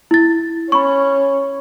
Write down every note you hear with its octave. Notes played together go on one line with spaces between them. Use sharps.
E4 A6
C#4 B5 C#6